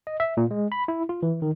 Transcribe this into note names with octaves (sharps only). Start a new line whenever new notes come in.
D#5
E5
A#2
G#3
B5
E4
F4
E3
D#3